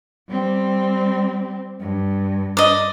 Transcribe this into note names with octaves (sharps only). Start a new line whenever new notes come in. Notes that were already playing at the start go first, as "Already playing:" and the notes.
G3 C4
G2
D5 D#5